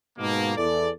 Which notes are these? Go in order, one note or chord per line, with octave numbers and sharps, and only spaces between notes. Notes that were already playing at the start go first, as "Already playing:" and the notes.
G#2 B2 A#3
E2 E3 A4 D5